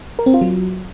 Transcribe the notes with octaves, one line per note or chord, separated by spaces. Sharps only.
A#4
C4
F4
F#3